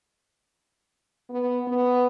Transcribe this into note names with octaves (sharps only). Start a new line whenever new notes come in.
B3
B3